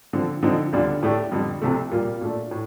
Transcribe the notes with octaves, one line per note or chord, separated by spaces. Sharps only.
D3 F3 C4
D3 F3 C4 D#4
D2 D3 G3 D4 F4
A2 A3 D4 G4
F2 D3 G3
C2 C3 F3 A3
A#2 G3 A#3 F4
A#2 A3 D4
A2